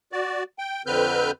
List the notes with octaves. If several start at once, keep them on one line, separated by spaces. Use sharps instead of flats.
F#4 D5
G5
F2 D3 C4 B4 F6 G6